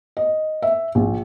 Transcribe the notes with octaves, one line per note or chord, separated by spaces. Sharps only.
D#5
E5
A#1